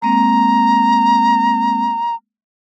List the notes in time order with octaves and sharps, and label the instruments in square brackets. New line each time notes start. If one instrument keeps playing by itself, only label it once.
[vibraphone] G#3 A#3 C4 [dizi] A#5